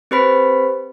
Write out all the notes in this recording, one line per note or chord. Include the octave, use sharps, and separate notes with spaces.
C4 G4 B4 C5 B5 B6